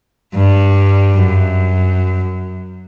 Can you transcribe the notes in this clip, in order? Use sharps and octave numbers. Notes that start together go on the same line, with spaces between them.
G2 G3
F#2